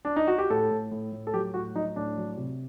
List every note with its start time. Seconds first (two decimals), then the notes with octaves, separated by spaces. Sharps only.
0.05 D4
0.16 D#4
0.27 F#4
0.38 G4
0.50 A2 A4
0.71 A2
0.91 A2
1.12 A2
1.27 A4
1.34 F#3 G4
1.54 A2 F#4
1.75 F#3 D#4
1.96 A2 D4
2.17 F#3
2.37 C3